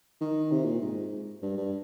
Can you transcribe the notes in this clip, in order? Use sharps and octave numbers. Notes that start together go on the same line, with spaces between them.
D#3
C3
A#2
G#2
G2
G2